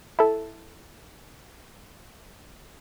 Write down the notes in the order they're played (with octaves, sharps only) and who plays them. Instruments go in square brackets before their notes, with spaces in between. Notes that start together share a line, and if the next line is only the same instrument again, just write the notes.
[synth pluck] E4 A4